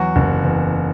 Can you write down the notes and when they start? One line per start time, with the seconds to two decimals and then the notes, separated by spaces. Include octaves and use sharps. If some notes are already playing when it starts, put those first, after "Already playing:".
Already playing: E2 F#3 F#4
0.16 F#1
0.44 E2